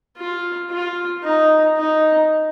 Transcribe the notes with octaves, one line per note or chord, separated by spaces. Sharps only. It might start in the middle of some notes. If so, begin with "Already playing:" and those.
F4
F4
D#4
D#4